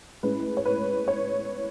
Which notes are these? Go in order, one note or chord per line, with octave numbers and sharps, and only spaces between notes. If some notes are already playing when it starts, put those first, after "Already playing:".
A2 G#3 C#4 B4
C#5
B4
C#5